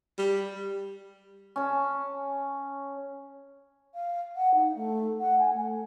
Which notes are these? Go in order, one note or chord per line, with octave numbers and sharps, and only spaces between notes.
G3
C#4 A5
F5
F#5
D#4
A3
F#5
G#5
A3